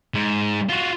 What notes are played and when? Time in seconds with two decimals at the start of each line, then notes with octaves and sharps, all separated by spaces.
0.14 G#2
0.69 F4 F#4